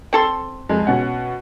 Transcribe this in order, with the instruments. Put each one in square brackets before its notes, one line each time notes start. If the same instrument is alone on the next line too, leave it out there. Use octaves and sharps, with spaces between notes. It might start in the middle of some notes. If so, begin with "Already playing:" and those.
[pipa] C4 A4 C6
[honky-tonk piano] F2 G#3
B2 C#4 F#5